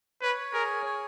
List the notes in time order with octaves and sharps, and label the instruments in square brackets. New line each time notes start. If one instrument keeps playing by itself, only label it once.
[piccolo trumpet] B4 [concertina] C#5
[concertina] G#4 [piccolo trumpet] A#4
[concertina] C#5